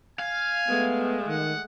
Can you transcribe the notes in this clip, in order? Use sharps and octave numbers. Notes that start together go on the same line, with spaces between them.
F5 G#5
G#3 A3 B3
D#3 F#5